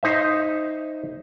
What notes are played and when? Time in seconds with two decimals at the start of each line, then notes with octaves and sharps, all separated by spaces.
0.03 D#4 C5 E5